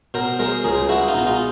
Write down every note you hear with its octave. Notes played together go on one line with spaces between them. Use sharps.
B2 A#4 C5
G#3 A#4 C5
C#2 G#4 A#4
G#3 E4 F#4
D#4 F4
B2
D#4 F4